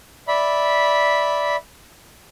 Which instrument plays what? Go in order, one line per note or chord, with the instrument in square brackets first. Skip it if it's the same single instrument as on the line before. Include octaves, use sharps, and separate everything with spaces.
[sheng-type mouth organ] D5 E5 B5